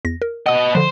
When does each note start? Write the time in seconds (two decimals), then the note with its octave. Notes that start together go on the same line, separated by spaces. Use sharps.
0.05 E2 A#6
0.22 A#4
0.46 B3 D#5 F#5 D#6
0.75 D3 F3 C5